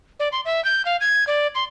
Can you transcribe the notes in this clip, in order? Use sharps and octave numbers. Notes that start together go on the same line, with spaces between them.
D5
C6
E5
G6
F5
G#6
D5
C6